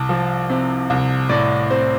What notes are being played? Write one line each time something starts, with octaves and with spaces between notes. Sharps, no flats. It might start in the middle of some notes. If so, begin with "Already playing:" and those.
Already playing: C2 A5
F3
C3
C2
A2 D5
C4 C5